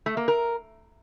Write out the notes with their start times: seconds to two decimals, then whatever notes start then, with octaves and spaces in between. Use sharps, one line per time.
0.06 A3
0.17 A#3
0.28 A#4